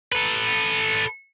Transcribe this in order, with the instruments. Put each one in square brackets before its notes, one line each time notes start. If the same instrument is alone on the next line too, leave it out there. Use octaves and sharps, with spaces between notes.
[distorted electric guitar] A4 B4